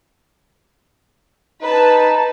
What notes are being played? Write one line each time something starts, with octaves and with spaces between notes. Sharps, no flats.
D#4 B4 A5